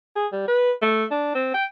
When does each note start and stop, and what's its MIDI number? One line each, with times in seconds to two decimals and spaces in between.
0.16 0.27 68
0.32 0.45 55
0.48 0.71 71
0.82 1.04 57
1.11 1.34 62
1.35 1.49 60
1.54 1.64 79